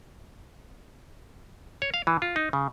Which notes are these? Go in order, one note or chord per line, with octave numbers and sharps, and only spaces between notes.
C#5
F5
E3
F4
D#4
C#3